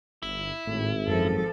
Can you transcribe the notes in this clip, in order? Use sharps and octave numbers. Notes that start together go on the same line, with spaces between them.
G1 E4
G#1 A2
F#2 F3 A4